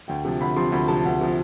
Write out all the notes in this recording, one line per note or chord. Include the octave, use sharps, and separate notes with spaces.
D2 G5
C3 F3
D2 B5
C3 F3 C6
D2 B5
C3 F3 A5
D2
C3 F3